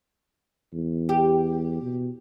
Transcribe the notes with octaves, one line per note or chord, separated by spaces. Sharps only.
E2
G4
B2